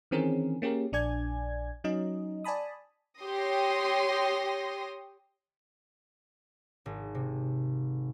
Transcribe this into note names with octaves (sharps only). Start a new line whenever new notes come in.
D#3 E3 C4 C#4 G#4 A#4
A#3 C#4 G4 G#4 A#4
A#1 D4 D5 G#5 G#6
F#3 C#4 D#4 D#5
D5 G#5 A5 B5 D#6
G4 C#5 C6 D#6 A#6
G#1
C3